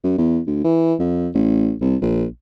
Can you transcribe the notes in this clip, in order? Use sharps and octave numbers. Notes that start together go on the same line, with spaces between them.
F#2
E2
D2
E3
F2
A1
C2
A#1